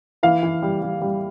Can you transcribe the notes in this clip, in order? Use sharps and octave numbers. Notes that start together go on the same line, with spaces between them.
E3 F5
E3
G3
G3
G3